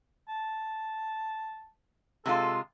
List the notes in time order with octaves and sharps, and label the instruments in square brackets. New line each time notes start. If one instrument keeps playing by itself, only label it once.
[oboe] A5
[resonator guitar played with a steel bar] C3 G#3 F4 [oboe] A4